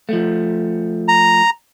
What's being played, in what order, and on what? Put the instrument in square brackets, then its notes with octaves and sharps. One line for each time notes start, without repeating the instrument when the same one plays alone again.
[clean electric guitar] F3 A3
[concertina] A#5